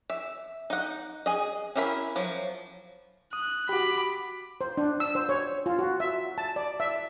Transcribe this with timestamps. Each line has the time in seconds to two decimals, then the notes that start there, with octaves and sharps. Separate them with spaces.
0.10 E5
0.70 D#4 F#5
1.26 G#4 D#5
1.76 C#4 E4 A#4 E5 B5
2.16 F3 F#3
3.33 D#6 F#6
3.69 F#4 G4 B5 D6
4.61 C5
4.77 D4
5.00 E6
5.15 C5
5.29 C#5
5.66 F4
5.79 F#4
6.00 E5
6.38 A5
6.56 D5
6.80 E5